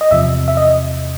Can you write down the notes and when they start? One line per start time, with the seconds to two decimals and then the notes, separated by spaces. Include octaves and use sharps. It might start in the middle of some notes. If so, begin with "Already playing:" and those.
0.01 D#5
0.11 E2 C3 F3 E5
0.48 E5
0.57 D#5